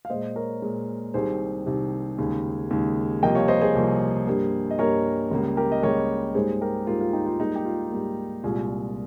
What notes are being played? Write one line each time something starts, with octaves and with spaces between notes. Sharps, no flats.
F5
A#2 G#3 C5 D#5
A#4 C#5
A#2 G#3
C2 C3 D#3 G#4 C5
C2 C3 D#3
D#2 C#3 G#3
D#2 C#3 G#3
C2 C3 F3 A#3 D#5 G5
C#5 F5
C5 D#5
G#4 C5
C2 C3 F3 A#3
G2 G3 A#3
D#5
G2 G3 A#3 A#4 C#5
C#2 C#3 G3 A#3
G4 A#4
D#5
C#2 C#3 G3 A#3 A#4 C#5
G#2 G3 A#3 G#4 C5
G4 A#4
G#2 G3 A#3 F4
F4
D#4 G4
F4
G#2 G3 A#3 D#4
G4
F4
G#2 G3 A#3
C2 A#2 G#3 F4 G#4